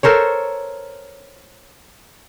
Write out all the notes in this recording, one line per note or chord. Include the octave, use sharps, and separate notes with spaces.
A4 A#4 C5 C#5